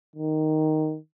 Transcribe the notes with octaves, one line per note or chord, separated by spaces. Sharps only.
D#3